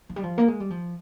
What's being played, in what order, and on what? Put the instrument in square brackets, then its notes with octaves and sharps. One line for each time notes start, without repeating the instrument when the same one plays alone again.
[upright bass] F3
G3
F3
A#3
G#3
G3
F3